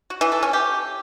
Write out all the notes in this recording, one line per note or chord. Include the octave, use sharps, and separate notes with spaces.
F#4
E3
A4
C#4
G4